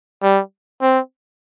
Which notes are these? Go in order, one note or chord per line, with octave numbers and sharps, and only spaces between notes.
G3
C4